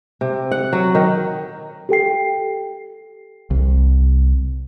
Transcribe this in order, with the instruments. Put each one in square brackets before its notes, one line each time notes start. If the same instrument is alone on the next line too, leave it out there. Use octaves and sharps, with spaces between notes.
[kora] C3
F#5
F#3
D#3
[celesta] G4 A4 G5 C7
[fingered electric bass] C2